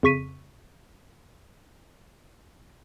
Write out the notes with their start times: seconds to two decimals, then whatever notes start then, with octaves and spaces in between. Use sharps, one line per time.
0.03 F2 C#3 C#6 B6 D#7